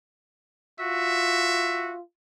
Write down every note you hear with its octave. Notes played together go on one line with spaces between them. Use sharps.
F4 F#4 E5